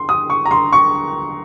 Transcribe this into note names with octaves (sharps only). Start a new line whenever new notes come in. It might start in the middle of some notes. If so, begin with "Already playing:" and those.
Already playing: C6
D#6
C#6
A#5
C6
C#6